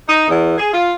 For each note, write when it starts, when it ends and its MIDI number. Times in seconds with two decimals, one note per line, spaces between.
0.09 0.26 63
0.28 0.55 40
0.58 0.71 68
0.73 0.92 65